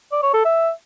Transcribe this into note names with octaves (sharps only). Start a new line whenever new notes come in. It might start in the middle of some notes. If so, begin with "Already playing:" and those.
D5
C#5
A4
E5